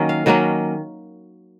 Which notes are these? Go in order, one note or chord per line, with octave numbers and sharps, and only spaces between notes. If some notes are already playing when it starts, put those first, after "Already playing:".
Already playing: D#3 F#3 A#3 C#4
F5
D#3 F#3 A#3 C#4